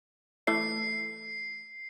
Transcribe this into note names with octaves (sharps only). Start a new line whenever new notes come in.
E3 A3 E4 C7